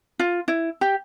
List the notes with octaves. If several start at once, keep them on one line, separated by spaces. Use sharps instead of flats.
F4
E4
G4